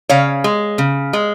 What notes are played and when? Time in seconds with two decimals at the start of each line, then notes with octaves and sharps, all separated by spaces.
0.09 C#3 C#5 F5
0.44 G#3
0.78 C#3
1.13 G#3